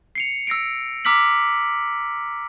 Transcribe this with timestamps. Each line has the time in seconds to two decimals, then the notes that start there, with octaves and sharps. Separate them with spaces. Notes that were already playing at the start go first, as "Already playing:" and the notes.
0.15 C7 C#7 F7
0.47 E6 A#6 C7 D7
1.05 A#5 D6 E6 F6 B6 F#7